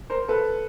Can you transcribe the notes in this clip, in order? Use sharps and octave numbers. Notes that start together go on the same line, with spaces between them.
A#4 C5
A4 B4